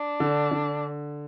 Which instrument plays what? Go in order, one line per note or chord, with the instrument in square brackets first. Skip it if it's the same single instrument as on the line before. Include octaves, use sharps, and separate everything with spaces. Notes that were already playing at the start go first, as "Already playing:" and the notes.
Already playing: [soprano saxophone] D4
[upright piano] D3
D3